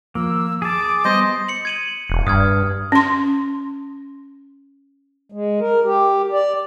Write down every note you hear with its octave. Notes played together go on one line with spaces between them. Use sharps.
D#2 F3 A#3 E6
G#4 A5 D6
G3 B3 C5 D#5 D#6
C#7 F#7
G#6 D#7 F#7
E1
G2 D#6 F6 G#6
C#4 C6
G#3
A#4
G4
D5